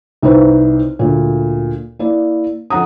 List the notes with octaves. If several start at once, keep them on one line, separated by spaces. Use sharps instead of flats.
C2 D#4 B4 C5
D2 A#2
A#3 E4 D5
F2 F#5 A#5 D#6